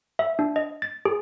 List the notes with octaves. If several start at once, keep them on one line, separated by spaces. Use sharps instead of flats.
E5
D4
D#5
A6
G#4